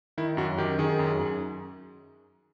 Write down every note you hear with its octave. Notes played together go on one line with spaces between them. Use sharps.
D#3 E4
F#2 F#4
D#3 G4
D#3 G#4
F#2
F#2